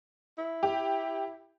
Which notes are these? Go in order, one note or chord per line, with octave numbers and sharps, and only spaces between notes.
E4
G4